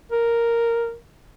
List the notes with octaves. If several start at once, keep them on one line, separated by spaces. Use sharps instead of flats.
A#4